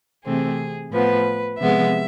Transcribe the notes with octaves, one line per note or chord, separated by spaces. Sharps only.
C3 E3 A3 C4 G#4
A2 F3 B3 B4
C3 F3 G#3 B3 E5